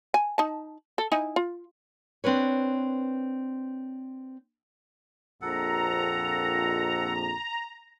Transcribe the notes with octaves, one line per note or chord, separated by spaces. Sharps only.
G#5
D#4 A5
A4
D#4 E4 G#5
F4
C4 D4 B4 C#5
A#1 F2 A4 F#5 A#5